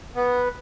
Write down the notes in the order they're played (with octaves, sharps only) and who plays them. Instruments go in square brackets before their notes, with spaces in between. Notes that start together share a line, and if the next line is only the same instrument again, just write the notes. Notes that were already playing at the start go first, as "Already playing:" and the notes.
[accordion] B3